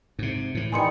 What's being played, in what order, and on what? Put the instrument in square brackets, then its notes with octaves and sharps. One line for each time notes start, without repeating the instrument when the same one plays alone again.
[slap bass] G#2 C3
A2 E3
[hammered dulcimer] D#3 G3 B3 [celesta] G#5 C6 C#7